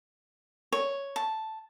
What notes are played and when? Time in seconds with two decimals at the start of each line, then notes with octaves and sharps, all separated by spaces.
0.73 C#5
1.16 A5